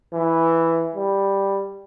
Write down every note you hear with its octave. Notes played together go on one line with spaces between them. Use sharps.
E3
G3